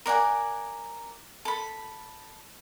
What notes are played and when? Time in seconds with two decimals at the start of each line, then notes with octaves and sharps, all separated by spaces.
0.06 A#4 D5 F#5 G#5
1.45 A4 B5